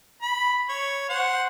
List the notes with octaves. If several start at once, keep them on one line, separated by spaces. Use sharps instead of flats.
B5
C#5
C5 F#5